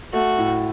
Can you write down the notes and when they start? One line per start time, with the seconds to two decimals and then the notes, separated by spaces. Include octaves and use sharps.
0.13 A3 F#4
0.39 A2